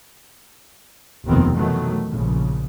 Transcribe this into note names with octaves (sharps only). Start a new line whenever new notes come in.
F1 D#2 B2 D#3 B3 C4
B2 D#3 E3 F#3 A3
A#1 C#3